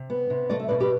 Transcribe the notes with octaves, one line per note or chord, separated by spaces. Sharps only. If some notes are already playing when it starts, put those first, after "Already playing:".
Already playing: C3
B3
C3
A3 D5
E5
B2 B4 D5
G4 B4